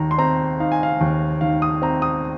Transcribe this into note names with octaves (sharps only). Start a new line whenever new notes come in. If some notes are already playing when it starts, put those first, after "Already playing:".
Already playing: D#2 D#3 A#5
C6
C4 A#5
D#4 F5
G#5
F5
D#2
D#3 F5
D#6
C4 A#5
D#6